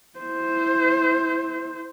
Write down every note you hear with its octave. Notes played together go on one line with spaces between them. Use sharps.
E4 C5